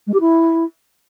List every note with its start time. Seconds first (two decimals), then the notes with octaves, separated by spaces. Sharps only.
0.07 G#3
0.13 G4
0.20 E4